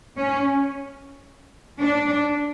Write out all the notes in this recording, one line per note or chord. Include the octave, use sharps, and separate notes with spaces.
C#4
D4